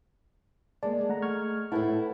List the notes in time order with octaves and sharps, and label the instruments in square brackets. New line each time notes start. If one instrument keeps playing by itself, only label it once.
[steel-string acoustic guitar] G#3 [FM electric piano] A#3 A5 [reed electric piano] D5
[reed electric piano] A3 [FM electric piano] F#5 A#5
[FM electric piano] C#6 F6 G#6
[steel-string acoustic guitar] A2 E4 [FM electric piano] A4 B4 A5 [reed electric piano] F#5